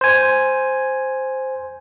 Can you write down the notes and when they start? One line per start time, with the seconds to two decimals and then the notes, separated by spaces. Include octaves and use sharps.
0.01 C5 G#5